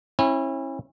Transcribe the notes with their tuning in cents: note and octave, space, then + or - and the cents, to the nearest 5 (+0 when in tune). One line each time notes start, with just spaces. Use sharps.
C#4 -40 E4 -10